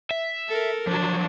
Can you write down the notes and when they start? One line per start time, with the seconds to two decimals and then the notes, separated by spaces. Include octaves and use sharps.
0.11 E5
0.48 A4 A#4
0.87 F3 F#3 D4